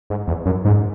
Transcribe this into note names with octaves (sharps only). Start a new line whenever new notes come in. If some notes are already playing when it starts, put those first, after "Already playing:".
G#2
E2
F#2
G#2